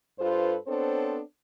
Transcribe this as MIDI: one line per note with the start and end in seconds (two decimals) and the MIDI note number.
0.19 0.56 43
0.19 0.56 65
0.19 0.56 69
0.19 0.56 71
0.19 0.56 72
0.67 1.20 59
0.67 1.20 60
0.67 1.20 62
0.67 1.20 69
0.67 1.20 72
0.67 1.20 73